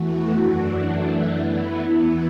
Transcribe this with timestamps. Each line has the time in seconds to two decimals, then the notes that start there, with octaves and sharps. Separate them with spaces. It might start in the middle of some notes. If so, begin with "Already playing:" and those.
Already playing: E2 E3 A3 F#4
0.34 F#2 E3 D4 F#4
0.85 F#2 E3 A3 D4
1.36 E3 B3 E4
1.87 E2 E3 B3 E4